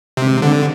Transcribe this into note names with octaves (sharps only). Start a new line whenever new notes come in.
G2 C3 D#3 G#3 C4
D3